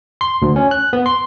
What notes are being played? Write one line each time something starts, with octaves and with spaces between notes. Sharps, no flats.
C6
D2
C#4
F#6
B3
C6